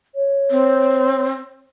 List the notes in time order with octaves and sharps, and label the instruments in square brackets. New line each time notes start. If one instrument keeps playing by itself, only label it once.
[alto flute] C#5
[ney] C4